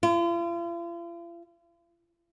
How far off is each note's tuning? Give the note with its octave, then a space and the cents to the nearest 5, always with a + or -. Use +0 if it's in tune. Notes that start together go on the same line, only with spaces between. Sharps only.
F4 -45